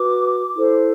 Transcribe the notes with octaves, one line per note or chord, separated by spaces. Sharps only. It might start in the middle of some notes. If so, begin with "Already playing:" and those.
Already playing: F#4 B4 D6
E4 A4 C5